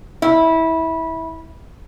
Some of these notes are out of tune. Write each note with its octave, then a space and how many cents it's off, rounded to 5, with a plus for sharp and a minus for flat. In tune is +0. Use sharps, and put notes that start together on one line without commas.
E4 -20